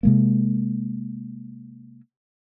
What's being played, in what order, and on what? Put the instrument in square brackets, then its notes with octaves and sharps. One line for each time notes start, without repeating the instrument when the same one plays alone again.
[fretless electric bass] C3 G#3 A#3